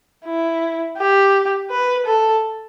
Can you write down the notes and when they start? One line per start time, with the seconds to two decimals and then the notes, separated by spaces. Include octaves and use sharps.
0.25 E4
0.97 G4
1.71 B4
2.06 A4